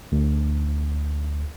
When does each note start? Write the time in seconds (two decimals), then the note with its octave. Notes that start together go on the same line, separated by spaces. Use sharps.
0.12 D2